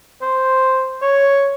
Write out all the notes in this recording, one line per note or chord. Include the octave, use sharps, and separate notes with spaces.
C5
C#5